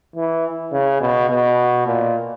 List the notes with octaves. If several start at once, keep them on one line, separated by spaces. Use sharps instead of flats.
E3
C#3
B2
B2
A#2